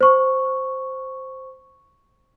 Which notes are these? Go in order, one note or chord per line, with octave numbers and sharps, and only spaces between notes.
C5 C#6